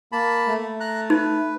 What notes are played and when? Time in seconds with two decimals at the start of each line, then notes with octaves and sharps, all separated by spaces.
0.12 A#3 A5 B5
0.48 A3
0.80 A#5 F#6
1.10 D#4 B4